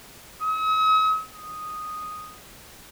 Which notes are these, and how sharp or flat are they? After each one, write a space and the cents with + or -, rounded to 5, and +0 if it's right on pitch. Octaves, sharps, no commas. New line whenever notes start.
D#6 +45
D#6 -5